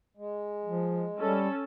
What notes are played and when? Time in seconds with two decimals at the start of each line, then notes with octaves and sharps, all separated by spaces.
0.17 G#3
0.65 F3
1.19 G3 C#4 A4